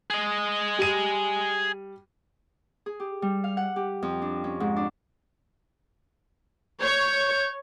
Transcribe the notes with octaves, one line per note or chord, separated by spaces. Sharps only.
G#4 D#5
G3 D#7
G#4
G4
G3
F5
F#5
G4
F2
D4
C#4
G#2
D4
C#5 G6